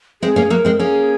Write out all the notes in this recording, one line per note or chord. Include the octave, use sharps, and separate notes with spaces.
G#3 C4 G#4
A#3 C#4
F#3 A#3 A#4
G#3 C4
A#3 C#4 G#4